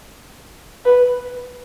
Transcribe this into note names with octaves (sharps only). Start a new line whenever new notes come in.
B4